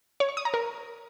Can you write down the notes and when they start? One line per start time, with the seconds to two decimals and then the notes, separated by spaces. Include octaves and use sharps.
0.20 C#5
0.29 C#6
0.37 D#6
0.45 A#5
0.54 A#4